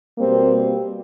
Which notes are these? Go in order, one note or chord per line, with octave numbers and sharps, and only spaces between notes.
B2 G3 A#3 C4